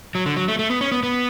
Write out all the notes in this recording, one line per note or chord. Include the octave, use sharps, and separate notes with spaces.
F#3
D3
F#3
A3
A3
B3
C#4
B3
B3